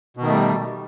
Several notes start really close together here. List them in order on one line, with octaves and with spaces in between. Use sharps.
B2 D#3 A3 G3